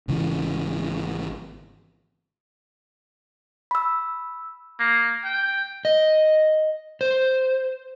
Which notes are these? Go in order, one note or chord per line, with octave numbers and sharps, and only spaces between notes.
G#1 C#3 E3
B5 E6
A#3
G5
D#5
C5